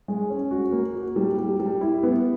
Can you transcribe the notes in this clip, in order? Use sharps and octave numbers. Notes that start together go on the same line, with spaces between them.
G#3
C#4
F#4
A#3
F#4
G3
G3
G3
E4
B3